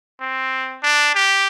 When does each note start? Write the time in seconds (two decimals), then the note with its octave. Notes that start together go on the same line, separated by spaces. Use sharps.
0.20 C4
0.83 D4
1.15 G4